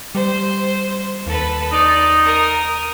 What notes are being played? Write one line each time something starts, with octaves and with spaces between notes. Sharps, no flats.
G3 C5
D#2 A4 B4
D#4 D5
A#4 D#6